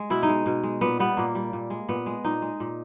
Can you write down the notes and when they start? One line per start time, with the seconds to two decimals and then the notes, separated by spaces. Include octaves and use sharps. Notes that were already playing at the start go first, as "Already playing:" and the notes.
Already playing: G#3
0.10 B2 E4
0.23 D#4
0.29 G#3
0.46 B2
0.63 G#3
0.81 A#2 B3
1.00 G3 B3
1.17 A#2 A#3
1.35 G3
1.53 A#2
1.70 G#3
1.89 A#2 B3
2.06 G#3
2.25 A#2 D#4
2.42 G#3
2.60 A#2